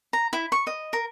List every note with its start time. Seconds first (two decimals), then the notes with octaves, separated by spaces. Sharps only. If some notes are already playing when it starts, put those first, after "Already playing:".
0.13 A#5
0.33 E4
0.52 C#6
0.67 D#5
0.93 A#4